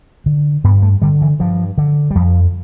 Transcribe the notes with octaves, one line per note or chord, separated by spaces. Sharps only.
D3
G2 B3
A3
D3 G3
E3
G2 F3
D3
G3
F2 F3